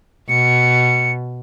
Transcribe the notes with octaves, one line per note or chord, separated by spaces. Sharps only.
B2 C#7